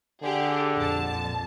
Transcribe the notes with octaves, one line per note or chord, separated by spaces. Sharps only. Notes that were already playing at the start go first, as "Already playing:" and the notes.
D3 G4 G#4
A#1 F2 A5